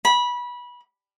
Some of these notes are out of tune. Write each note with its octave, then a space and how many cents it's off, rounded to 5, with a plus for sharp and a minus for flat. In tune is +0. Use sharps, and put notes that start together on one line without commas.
B5 -20